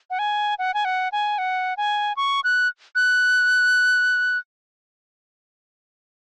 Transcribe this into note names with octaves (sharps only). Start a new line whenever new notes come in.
F#5
G#5
F#5
G#5
F#5
G#5
F#5
G#5
C#6
F#6
F#6